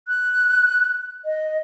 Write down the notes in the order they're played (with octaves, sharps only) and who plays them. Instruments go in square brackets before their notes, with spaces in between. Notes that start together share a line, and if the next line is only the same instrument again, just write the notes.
[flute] F#6
D#5